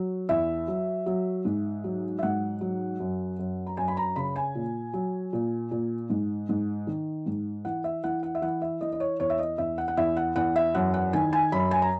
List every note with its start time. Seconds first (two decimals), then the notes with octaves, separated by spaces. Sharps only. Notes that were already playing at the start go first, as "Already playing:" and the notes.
Already playing: F#3
0.29 E2 E5
0.68 F#3
1.06 F#3
1.45 G#2
1.84 F#3
2.19 E5
2.23 G#2 F#5
2.61 F#3
3.00 F#2
3.39 F#2
3.67 A#5
3.77 F#2 G#5
3.88 B5
3.97 A#5
4.16 C#3 B5
4.36 G#5
4.55 A#2
4.93 F#3
5.33 A#2
5.71 A#2
6.10 G#2
6.49 G#2
6.87 D#3
7.26 G#2
7.65 E3 F#5
7.84 E5
8.04 E3 F#5
8.23 F#5
8.35 E5
8.42 E3 F#5
8.62 E5
8.81 E3 D#5
8.92 D#5
9.00 C#5
9.20 E2 C#5
9.30 E5
9.39 D#5
9.58 E2 E5
9.78 F#5
9.88 F#5
9.97 E2 E5
10.17 F#5
10.36 E2 F#5
10.56 E5
10.74 F#2 F#5
10.94 F#5
11.13 D#3 G#5
11.33 G#5
11.52 F#2 B5
11.71 G#5
11.82 A#5